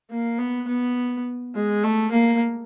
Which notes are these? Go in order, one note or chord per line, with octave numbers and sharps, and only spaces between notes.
A#3
B3
B3
G#3
A3
A#3